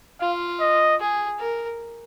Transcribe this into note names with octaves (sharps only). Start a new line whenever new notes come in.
F4 F5
D#5
G#4
A#4